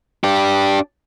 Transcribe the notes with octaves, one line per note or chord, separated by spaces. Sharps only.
D4 G4